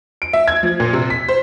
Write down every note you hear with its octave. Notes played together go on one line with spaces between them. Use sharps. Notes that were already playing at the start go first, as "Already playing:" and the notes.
D7
E5
G#6
F3
A#2
C3
B6
C5